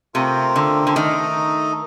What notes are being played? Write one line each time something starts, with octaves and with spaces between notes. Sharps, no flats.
C3 A3 C4 F4 A#4
D3
D3
D#3 A3 D#4 A4 D#5